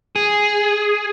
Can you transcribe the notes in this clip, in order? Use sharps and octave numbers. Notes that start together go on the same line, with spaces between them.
G#4